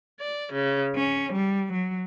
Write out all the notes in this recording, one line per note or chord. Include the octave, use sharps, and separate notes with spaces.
D5
C#3
C#4
G3
F#3